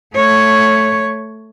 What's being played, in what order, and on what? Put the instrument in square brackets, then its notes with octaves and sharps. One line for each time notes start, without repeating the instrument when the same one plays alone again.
[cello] A3 C#5